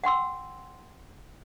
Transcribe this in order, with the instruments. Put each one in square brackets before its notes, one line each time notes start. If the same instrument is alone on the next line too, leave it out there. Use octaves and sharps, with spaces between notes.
[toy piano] F#5 G5 C6 E6